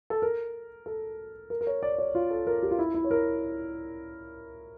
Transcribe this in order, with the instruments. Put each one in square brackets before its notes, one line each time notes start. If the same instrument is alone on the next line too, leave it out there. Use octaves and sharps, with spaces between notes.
[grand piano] A4
A#4
A4
A#4
A#4
C#5
D5
C#5
F4
A4
A#4
G4
F4
E4
E4
C#5
A#4